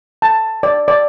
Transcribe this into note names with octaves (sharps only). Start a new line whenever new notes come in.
A5
D5
D5